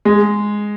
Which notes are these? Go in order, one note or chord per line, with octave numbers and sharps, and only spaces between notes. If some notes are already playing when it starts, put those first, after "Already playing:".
G#3